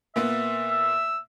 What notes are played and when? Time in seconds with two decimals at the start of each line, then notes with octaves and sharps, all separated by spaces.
0.16 A#2 A#3 B3 E5
0.72 E6